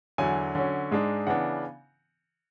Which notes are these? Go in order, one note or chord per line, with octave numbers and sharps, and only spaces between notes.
E2 D3 F#3 G#5
D3 F#3 C#4
G#2 G#3 D4
C#3 E3 B3 D4 F#5